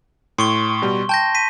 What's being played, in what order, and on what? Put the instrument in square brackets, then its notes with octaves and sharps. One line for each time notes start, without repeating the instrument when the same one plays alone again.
[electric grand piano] A2 [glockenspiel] C6 C#6 G7
[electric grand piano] B2 G3
[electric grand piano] G5 [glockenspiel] A5 G6 A#6
[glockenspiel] B6 D#7